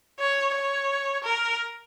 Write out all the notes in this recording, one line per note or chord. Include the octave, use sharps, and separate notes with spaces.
C#5
C#5
A#4